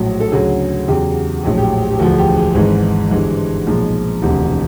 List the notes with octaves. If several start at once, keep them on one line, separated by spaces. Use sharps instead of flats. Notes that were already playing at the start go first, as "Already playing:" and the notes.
Already playing: A#1 A2 F#3
A4
D2 C#3 F#3 G#4
E2 C#3 F#3 G4
A#1 A2 F#3 G#4
G4
G4
E1 D2 D3 F3 F#4
G#4
G4
G#4
G#1 G#2 E3 G#3 G#4
G1 G2 E3 G#3
B1 A#2 F3 G#3
E1 D2 C3